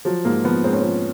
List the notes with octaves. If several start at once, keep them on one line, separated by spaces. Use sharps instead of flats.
F3 F#3
G#2 A#3
F3 B3
G#2 C4
C#4
F3 C4